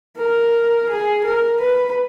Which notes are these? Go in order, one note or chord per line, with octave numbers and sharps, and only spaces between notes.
A#4
G#4
A#4
B4